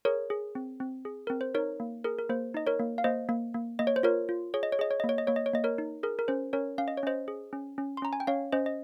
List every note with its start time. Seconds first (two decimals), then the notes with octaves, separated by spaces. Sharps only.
0.05 G#4 A#4 C#5
0.30 G#4
0.55 C4
0.80 C4
1.05 G#4
1.27 C4 A#4
1.41 C5
1.55 D#4 A#4 C#5
1.80 A#3
2.04 G#4 A#4
2.19 A#4
2.29 A#3 C5
2.54 D#4 D#5
2.67 A#4 C#5
2.79 A#3
2.98 F5
3.04 A#3 C5 D#5
3.29 A#3
3.54 A#3
3.79 A#3 D#5
3.87 C#5
3.96 C5
4.03 F4 A#4 C#5
4.29 F4
4.54 G#4 C#5
4.63 D#5
4.72 C#5
4.79 G#4 D#5
4.91 C#5
5.00 A#3 D#5
5.09 C#5
5.18 D#5
5.27 A#3 C#5
5.36 D#5
5.46 C#5
5.53 A#3 D#5
5.64 A#4 C#5
5.78 D#4
6.03 G#4 A#4
6.19 A#4
6.28 C#4 C5
6.53 C#4 A#4 C#5
6.78 C#4 F5
6.88 D#5
6.97 C#5
7.03 C#4 C5 D#5
7.28 G#4
7.53 C#4
7.78 C#4
7.97 C6
8.02 C#4 A#5
8.13 G#5
8.20 G5
8.27 C#4 C#5 F5
8.52 C#4 C5 D#5
8.66 D#5